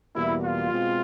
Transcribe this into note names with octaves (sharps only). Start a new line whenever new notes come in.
E2 B2 G3 A#3 E4
F4
B2 G#3 C4